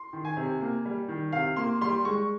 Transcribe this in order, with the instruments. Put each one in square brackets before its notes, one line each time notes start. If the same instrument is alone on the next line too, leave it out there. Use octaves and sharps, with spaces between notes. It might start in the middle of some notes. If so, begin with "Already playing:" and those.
Already playing: [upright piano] C6
D#3
G#5
C3
A#3
G3
D#3
C3 F5
A#3 C6
G3 C6
G#3 C#6